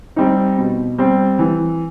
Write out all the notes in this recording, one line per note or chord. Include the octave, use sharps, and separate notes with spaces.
G3 C4 D#4
B2
G3 C4
E3